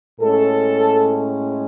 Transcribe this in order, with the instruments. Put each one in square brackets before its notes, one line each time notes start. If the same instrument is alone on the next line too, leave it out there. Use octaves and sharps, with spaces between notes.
[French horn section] A2 G#3 C#4 A4